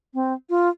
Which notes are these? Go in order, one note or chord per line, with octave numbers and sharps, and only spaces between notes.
C4
F4